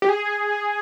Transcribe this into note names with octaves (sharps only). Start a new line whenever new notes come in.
G4
G#4